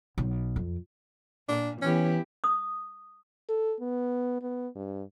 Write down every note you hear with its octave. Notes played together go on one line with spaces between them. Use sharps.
B1
F2
A#2 D4
E3 B3 C#4 E4 G4
D#6
A4
B3
B3
G2